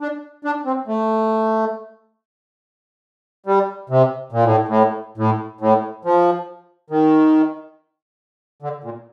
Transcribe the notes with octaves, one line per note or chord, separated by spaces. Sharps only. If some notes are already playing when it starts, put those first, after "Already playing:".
D4
D4
C4
A3
G3
C3
A#2
A2
A2
A2
A2
F3
D#3
D3
A#2